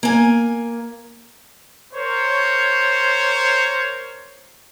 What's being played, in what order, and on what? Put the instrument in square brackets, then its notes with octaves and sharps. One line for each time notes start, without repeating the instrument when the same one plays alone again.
[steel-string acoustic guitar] A#3 G#5
[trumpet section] A#4 C5 C#5